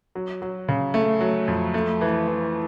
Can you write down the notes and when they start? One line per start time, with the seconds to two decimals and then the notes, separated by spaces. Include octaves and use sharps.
0.15 F#3
0.42 F#3
0.69 C#3
0.94 A3
1.21 F#3
1.48 F2
1.74 A3
2.01 E3
2.27 E3